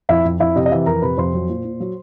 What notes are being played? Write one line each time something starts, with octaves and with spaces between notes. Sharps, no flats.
F2 E4 E5
F2
F2 E4 E5
C3 D#5
D#5
E3 E4 E5
F2 A#4 A#5
C3 B4 B5
F2 C5 C6
F#3
A#2
A#2
F#3